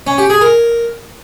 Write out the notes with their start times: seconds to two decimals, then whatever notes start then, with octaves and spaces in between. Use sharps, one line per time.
0.07 C#4
0.18 G4
0.30 G#4
0.41 A#4